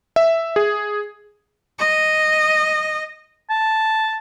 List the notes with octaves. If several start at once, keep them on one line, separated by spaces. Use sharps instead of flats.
E5
G#4
D#5
A5